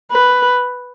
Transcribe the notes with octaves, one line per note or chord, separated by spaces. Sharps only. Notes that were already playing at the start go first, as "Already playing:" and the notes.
B4